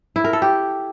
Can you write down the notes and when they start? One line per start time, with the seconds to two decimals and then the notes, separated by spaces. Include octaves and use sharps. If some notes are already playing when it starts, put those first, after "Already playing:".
0.16 E4
0.24 A#4
0.33 A4
0.42 G4